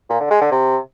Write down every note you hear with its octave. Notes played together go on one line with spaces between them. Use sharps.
A#2
D3
G#3
D3
C3